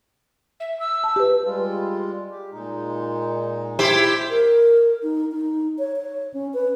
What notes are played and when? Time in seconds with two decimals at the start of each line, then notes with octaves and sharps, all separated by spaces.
0.60 E5
0.80 E6
1.04 A5
1.16 G4 B4
1.45 G3 G#3 F4
2.31 G4
2.52 A#2 G#3 D#4
3.79 E4 G4 C5
4.30 A#4
5.03 D#4
5.32 D#4
5.79 C#5
5.96 C#5
6.34 C#4
6.54 B4